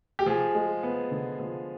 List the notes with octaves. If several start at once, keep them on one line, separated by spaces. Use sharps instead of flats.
G4
F3 G#4
G#3
B3
D3
F3